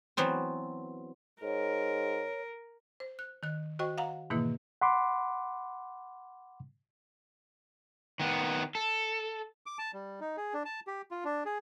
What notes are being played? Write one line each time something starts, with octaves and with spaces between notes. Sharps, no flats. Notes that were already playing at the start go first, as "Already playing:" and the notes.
E3 F#3 B3 C4
G#2 A#4 C#5
C5
F#6
D#3 F#6
F#4 C5 D#5 G5 C#6
F5 F#5 A#5
G#2 B2 D#3 E3 A#3 E4
F#5 B5 C6 D6
D#3 B3
A4
D6
A5
G3
D#4
G#4
D4
A5
G4
F4
D4
G#4